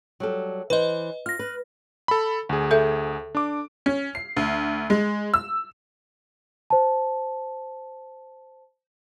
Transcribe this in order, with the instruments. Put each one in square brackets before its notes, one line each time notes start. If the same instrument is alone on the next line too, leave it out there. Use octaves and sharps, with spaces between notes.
[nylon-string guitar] F#3 G3 A4
[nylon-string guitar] E3 C5 [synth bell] B4 D#5
[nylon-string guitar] F4 [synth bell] F6 A#6
[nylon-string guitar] B4
[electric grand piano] A4 B5
D2 G#4
[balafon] A4 E5
[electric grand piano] D4 D6
[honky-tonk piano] C#4
C7
D2
G#3
E6
[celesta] C5 A5